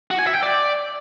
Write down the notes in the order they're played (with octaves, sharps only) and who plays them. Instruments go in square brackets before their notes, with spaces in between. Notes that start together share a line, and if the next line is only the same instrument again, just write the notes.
[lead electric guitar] F#4
G#5
E5
G5
D5